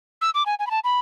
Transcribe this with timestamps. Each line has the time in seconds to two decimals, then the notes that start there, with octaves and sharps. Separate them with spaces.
0.21 E6
0.34 D6
0.46 G#5
0.59 G#5
0.67 B5
0.71 A5
0.84 B5